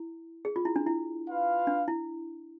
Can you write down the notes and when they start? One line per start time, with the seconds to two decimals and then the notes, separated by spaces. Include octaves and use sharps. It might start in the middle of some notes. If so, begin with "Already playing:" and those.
Already playing: E4
0.45 G#4
0.56 F4
0.65 E4
0.76 D4
0.86 E4
1.27 F4 B4 F5
1.67 D4
1.88 E4